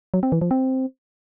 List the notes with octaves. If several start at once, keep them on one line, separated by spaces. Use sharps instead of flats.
F#3
C4
E3
F3
C4